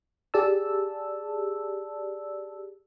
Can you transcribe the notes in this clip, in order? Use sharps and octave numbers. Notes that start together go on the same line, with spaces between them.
G4 G#4 D5 A5 E6